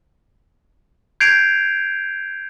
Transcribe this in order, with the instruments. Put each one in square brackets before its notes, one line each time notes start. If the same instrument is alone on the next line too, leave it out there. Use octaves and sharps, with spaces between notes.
[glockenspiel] G6 G#6 C7 D7 F7